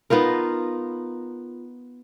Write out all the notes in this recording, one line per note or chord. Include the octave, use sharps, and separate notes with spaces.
B3 D#4 F4 A#4